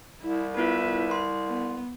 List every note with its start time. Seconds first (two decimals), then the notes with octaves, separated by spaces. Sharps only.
0.21 C2 E4
0.57 B3 E4 F4 B4 E5
1.11 C6
1.48 B3